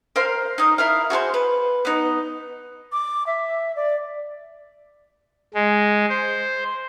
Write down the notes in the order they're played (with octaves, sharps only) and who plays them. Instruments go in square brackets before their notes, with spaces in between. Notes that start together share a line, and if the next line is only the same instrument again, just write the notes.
[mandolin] A#4 C5 F5 C6
D#4 D#5
E4 A#4 F5
F#4 G#4 A#4 C5
B4
B3 D#4
[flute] D6
E5
D5
[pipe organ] G#3
C5